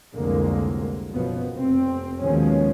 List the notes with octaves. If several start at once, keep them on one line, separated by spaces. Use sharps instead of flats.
C2 F2 A2 D3 G#3 A#3
F#1 F#2 B2 F3 B3
F1 C4
D#2 B2 D#3 F3 G#3 C#4